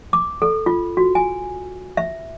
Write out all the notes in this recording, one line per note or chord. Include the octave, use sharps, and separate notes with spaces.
D6
A4
F4
F#4
G#5
E5